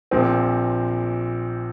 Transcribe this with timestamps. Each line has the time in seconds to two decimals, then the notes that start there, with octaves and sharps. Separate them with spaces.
0.11 A#1 A#2 F3 C4